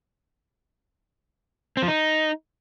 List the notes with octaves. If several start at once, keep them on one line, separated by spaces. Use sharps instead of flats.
C4
F3
D#4